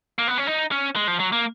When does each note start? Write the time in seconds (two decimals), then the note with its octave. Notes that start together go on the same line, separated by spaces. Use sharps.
0.19 A#3
0.28 B3
0.38 C#4
0.47 D#4
0.71 C#4
0.96 G#3
1.08 F3
1.20 F#3
1.32 A#3